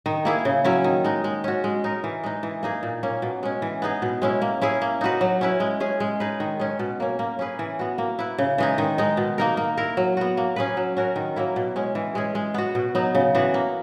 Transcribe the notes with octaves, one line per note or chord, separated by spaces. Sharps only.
D#3
A#3 E4 G#4
C#3
F#3 C#4 E4
D#3
G#3 D#4
G#3
C#4 F#4
G#3
D#4 A#4
E3
G#3 D#4
E3
A#3 D#4 G#4
A#2
A#3 C#4
B2
G#3 C#4
E3
B3 D#4 G#4
B2
G#3 C#4 E4
A#3
C#4 E4 G#4
A#3
D#4 F#4 B4
F#3
C#4 E4 B4
G#3
C#4 G#4
G#3
D#4 G#4 B4
D#3
G#3 C#4
B2
A#3 C#4
A#3
C#4 G#4 B4
E3
B3 F#4
A#3
E4 B4
C#3
E3 G#3 D#4
D#3
G#3 D#4
B2
A#3 D#4 A#4
A#3
E4 A#4
F#3
B3 F#4
A#3
C#4 G#4 B4
F#3
C#4 F#4 A#4
D#3
F#3 A#3 E4
B2
G#3 C#4
E3
G#3 C#4 G#4
G#3
B3 F#4
B2
F#3 B3 D#4
C#3
E3 B3 F#4
A#3